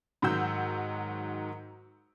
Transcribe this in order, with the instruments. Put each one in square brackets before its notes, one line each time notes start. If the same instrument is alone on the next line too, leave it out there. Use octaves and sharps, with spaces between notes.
[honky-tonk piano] G#2 D#3 F#3 F#5 E6 G6